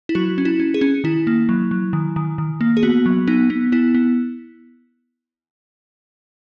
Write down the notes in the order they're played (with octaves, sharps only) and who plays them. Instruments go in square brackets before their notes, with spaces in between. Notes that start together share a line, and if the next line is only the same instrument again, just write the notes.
[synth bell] E4
F#3 F#4
C#4
E4
C#4
G#4
C#4
D#3 E4
A#3
F#3
F#3
D#3
D#3
D#3
A#3
G#4
B3 F#4
F#3
B3 D#4
B3
B3 E4
B3